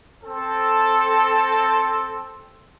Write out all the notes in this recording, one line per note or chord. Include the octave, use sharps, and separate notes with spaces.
C4 A4